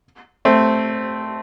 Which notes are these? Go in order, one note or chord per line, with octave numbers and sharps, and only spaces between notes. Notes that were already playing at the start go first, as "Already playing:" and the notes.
A3 C4